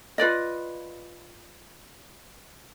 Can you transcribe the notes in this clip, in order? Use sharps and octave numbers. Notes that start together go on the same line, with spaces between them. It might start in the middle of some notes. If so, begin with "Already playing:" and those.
F4 B4 D5 D#5